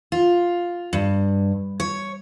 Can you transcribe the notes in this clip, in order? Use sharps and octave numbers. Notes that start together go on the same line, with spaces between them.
F4
G2
C#5